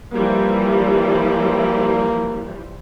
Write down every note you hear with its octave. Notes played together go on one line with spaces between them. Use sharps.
E3 F3 G3 A#3